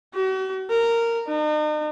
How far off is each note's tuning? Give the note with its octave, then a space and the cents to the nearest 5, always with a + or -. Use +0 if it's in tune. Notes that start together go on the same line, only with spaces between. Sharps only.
F#4 +45
A#4 -10
D#4 -40